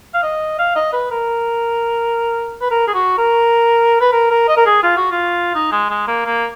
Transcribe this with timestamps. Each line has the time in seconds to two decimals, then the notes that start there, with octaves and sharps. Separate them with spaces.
0.14 F5
0.23 D#5
0.59 F5
0.76 D#5
0.93 B4
1.11 A#4
2.61 B4
2.71 A#4
2.87 G#4
2.94 F#4
3.18 A#4
4.01 B4
4.12 A#4
4.30 A#4
4.48 D#5
4.57 A#4
4.66 G#4
4.83 F4
4.97 F#4
5.11 F4
5.55 D#4
5.72 G#3
5.90 G#3
6.07 A#3
6.25 A#3